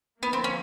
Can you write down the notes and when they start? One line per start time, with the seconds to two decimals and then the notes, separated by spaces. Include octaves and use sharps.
0.23 D3 F3 A#3 B3
0.33 C4
0.44 C#4